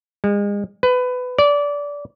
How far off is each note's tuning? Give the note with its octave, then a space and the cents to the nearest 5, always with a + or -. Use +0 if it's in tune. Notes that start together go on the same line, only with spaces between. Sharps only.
G#3 -35
B4 +20
D5 -20